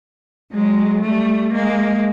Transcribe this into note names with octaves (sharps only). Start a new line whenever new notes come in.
F#3 G#3
G3 A3
G#3 A#3